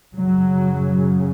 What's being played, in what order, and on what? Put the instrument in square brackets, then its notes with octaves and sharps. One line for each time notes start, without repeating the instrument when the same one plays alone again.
[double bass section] F#2 C#3 F#3